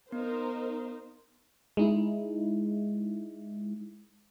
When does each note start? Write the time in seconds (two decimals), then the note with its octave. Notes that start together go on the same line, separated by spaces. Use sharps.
0.12 B3 D#4 A#4 C5
1.77 G#3 D#4 E4